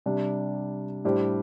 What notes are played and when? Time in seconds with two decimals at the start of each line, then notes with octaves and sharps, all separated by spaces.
0.06 C3 G3 D4
1.05 A2 G3 D4 G4 C5